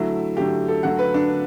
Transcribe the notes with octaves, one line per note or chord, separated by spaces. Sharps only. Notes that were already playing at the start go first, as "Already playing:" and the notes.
Already playing: D3 F#3 A3 E4
D3 F#3 A3 G4
A4
D3 F#3 A3 F#5
B4
D4
D3